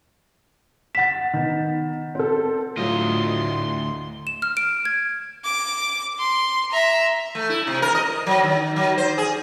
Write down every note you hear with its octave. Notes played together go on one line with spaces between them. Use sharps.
F#5 A6 B6 E7
D#3 B3
C4 A4
D2 A2 F#3 F4 D#5 C6
E7
F6
D7
G#6
D6
C6
E5 A#5
A3
E4
C3
A#4
D#5
F#3
D#3
F#3
C5
G#4